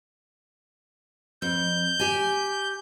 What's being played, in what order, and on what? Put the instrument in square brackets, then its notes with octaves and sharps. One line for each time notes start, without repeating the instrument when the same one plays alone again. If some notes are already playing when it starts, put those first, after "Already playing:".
[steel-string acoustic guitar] F2 [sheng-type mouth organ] G6
[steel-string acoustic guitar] G4 G#5